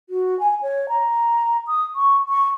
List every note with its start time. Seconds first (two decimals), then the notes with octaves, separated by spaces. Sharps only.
0.09 F#4
0.40 G#5
0.62 C#5
0.89 A#5
1.67 D#6
1.95 C#6
2.29 C#6